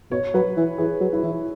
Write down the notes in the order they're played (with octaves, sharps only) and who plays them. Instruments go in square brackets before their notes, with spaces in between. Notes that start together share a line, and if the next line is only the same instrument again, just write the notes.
[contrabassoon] B2 [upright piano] C#5
[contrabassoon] F#3 [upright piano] B4
[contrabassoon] E3
[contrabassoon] E3 [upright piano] G#4
[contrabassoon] F#3
[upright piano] E4
[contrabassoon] E3